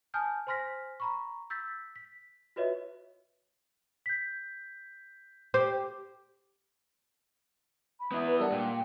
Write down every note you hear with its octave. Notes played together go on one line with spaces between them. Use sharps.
G#5 A5 D#6 F6 G6
C5 G#5 C6 F6 A#6 B6
A#5 B5 C#6
E6 G6 A6 B6
B6
F4 F#4 B4 C#5 D#5 E5
G6 B6
G4 C5
B5
B3 E4
B4
G3 D4 A#4 F#5
A#2 G5